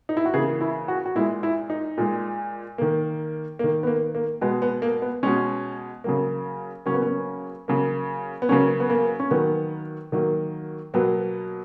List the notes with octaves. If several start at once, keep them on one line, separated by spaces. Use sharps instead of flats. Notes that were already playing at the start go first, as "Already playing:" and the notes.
D#4
E4
F#4
C#3 E3 A#3 G#4
E4
F#4
F#4
A#2 G#3 E4
E4
D#4
A#2 G#3
D#3 A#3
A#3
D#3
B3
A#3
A#3
B2 G#3 B3
B3
A#3
B3
B2 G#3 C#4
C#3 F#3 A#3
C#3 F#3 A#3 C#4
B3
C#4
C#3 F#3 A#3
B3
C#3 F#3 A#3 C#4
B3
A#3
C#4
D#3 F#3 A#3 B3
D#3 F#3 A#3
B2 F#3 A#3 B3